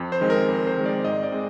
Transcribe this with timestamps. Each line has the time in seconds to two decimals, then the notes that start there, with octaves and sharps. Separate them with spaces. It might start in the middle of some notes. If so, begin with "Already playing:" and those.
Already playing: F2
0.12 C5
0.21 D#3 G#3 C4
0.30 A#4
0.48 F2
0.67 C5
0.77 D#3 G#3 C4
0.86 D5
1.04 G#2 D#5
1.23 D5
1.32 G#3 C4